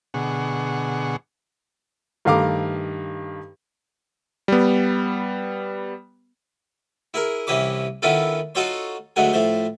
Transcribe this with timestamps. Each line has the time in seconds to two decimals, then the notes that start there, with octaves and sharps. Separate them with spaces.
0.14 B2 D3 G#4 F#5 C#6
2.25 G2 D#3 A3 F5 A#5 D6
4.48 G3 B3
7.14 E4 G#4 A#4
7.47 C2 C3 E3 C#4 E4 D6
8.02 D#3 B3 C#4 E4 F4 A4
8.55 D#4 F4 F#4 A4 C#5 C6
9.16 D2 F#3 G#3 A3 F#5 G#5
9.33 A2 F3 A3 C5